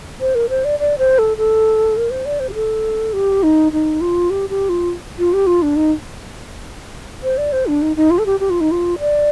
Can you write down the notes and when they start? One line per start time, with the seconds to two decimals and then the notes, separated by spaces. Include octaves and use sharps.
0.20 C5
0.35 A#4
0.49 C5
0.65 D5
0.79 D5
0.98 C5
1.18 A4
1.37 A4
1.97 A#4
2.10 C5
2.25 D5
2.40 C5
2.49 G4
2.54 A4
3.13 G4
3.43 D#4
3.72 D#4
4.01 F4
4.30 G4
4.49 G4
4.69 F4
5.18 F4
5.33 G4
5.47 F4
5.62 D4
5.76 D#4
7.23 C5
7.38 D5
7.52 C5
7.67 D4
7.82 D#4
7.96 D#4
8.10 F4
8.18 A4
8.26 G4
8.40 G4
8.50 F4
8.61 D#4
8.71 F4
8.99 D5